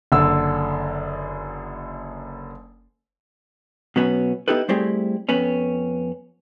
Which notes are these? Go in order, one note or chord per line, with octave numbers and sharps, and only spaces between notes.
F#1 D3 E6
B2 F#3 B3 C#4
B3 D#4 E4 G4 A4 B4
G3 A3 C4 E4 G4 G#4
F2 B3 C#4